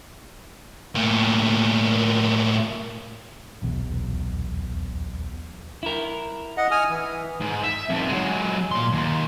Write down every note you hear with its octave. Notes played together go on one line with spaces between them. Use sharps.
A2 A#3
D#1 B1 E2 B2
E4 A#4
D#5 F#5
G#5 D#6 F6
E3
G#2
E5
F2 D#3
F#3 G#3
A#2 C6
D#2